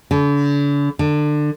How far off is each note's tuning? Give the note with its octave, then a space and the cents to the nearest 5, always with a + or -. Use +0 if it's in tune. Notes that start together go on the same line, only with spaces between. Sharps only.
D3 -40
D3 +25